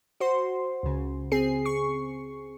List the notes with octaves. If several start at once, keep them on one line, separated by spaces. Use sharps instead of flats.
F#4 C5 C6
C#2 C#3
C4 G#4 C7
C#6